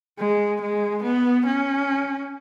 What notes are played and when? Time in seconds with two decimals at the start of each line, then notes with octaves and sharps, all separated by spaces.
0.18 G#3
0.61 G#3
1.03 B3
1.46 C#4